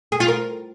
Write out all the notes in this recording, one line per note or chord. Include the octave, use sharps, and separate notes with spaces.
G#4
F4
A#4